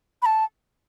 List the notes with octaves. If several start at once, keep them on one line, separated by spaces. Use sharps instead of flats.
B5
A5